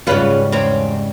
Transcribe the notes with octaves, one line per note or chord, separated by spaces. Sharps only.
G#2 C#3 G3 C#4 F4 B4
E2 C4 C#4